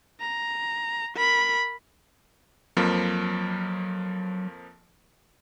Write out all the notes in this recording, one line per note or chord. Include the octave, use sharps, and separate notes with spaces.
A#5
A#4 B5
F2 F3 F#3 A#3